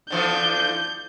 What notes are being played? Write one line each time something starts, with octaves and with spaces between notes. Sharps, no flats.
D3 E3 F3 G6